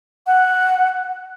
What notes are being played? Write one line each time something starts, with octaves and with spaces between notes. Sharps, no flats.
F#5